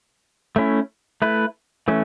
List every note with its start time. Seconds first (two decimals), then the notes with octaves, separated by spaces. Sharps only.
0.56 A3 C#4 E4
1.22 A3 E4 B4
1.88 E3 A3 C#4